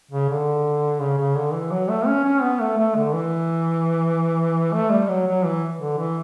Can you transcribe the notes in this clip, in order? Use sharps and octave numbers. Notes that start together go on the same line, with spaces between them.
C#3
D3
C#3
C#3
D3
E3
F#3
A3
C#4
C#4
B3
A3
A3
D3
E3
A3
G3
F#3
F#3
E3
D3
E3